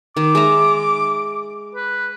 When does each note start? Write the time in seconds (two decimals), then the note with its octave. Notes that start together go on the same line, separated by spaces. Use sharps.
0.17 D#3 D6
0.35 G#3 E5 A#5
1.75 B4